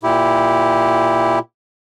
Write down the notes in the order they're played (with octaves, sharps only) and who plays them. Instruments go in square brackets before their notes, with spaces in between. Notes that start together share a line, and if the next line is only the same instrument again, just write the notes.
[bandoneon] A#2 E4 G4